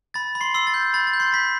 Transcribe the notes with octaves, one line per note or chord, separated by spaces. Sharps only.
B5 A6
B5
C6 C7
C6 E6 C7
A6
G6
B5 A6
A6
G6
C6 C7
B5 B6